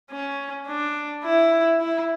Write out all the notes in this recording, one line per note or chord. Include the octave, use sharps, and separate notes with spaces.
C#4
D4
E4
E4